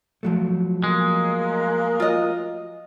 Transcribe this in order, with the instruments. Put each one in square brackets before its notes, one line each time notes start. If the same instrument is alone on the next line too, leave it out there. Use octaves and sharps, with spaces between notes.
[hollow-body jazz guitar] F3 F#3 A3
[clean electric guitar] G#3 [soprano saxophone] A#3
[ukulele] F4 D#5